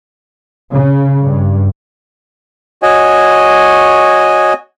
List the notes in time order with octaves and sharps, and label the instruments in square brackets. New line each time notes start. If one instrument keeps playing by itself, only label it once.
[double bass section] C#3
G2
[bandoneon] F#4 C#5 D#5 G#5